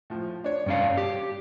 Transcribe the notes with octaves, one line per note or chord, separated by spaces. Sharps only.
A2 F3
D4 C#5
G2 C#4 F5
G4